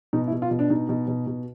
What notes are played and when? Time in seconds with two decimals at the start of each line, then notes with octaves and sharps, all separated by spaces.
0.13 B2 D#4
0.27 E4
0.32 B2
0.42 F4
0.51 B2
0.59 D4
0.70 B2 D#4
0.89 B2
1.08 B2
1.27 B2